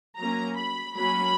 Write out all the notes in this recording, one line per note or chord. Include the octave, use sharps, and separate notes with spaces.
F#3 A#3 C#4 A#5
B5
F#3 A#3 C#4 B5